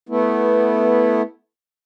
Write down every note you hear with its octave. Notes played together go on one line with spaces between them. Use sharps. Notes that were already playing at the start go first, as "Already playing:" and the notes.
A3 B3 E4